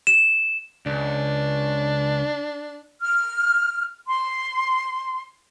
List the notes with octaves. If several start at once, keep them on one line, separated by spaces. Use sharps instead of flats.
E7
C#2 D4
F6
C6